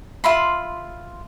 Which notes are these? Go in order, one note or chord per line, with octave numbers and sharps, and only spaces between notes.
F4 E5 B5 C6